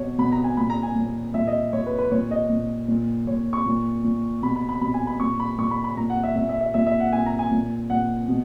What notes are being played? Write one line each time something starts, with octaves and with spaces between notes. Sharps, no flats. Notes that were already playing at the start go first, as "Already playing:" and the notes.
Already playing: B2 C#5
B2 B5
A#5
G#5
A#2 B5
A#5
G#5
A#2
A#2 E5
D#5
A#2 C#5
B4
B4
A#2 C#5
D#5
A#2
A#2
A#2 C#5
C#6
A#2
A#2
B2 B5
B5
B5
B2 B5
G#5
B5
A#2 C#6
B5
A#2 C#6
B5
B5
A#2 A#5
F#5
E5
A#2 E5
E5
E5
A#2 E5
E5
F#5
A#2 G#5
A#5
G#5
A#2
A#2 F#5
B2